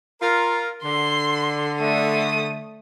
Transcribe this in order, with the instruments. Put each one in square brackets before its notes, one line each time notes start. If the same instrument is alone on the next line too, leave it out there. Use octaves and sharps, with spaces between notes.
[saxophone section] F4 A#4
[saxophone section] D3 [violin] C6
[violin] A3 D#6